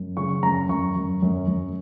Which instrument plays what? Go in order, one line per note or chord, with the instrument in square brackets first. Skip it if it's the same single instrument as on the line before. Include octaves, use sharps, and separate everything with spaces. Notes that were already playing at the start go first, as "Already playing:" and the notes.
Already playing: [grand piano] F#2
C#3 C#6
F#2 A#5
F#2 C#6
F#2
F#2
F#2